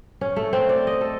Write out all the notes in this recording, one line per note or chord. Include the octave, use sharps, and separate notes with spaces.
C#4
A3
C4
D5
D#5
A4